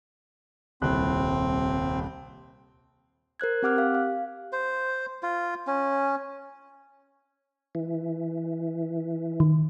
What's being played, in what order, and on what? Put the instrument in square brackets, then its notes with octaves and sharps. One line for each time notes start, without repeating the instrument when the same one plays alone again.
[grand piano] D#1 C2 F#6 [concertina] C4
[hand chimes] A#4 C5 F#6 G#6
C4 G4 F#5 D6 F6 F#6
G4 F5
F5
[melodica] C5
F4
C#4
[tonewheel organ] E3
[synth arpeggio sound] D#3